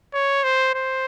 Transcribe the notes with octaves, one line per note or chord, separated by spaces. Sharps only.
C#5
C5
C5